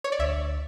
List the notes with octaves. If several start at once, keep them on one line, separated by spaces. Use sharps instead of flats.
C#5
D5
D2 E5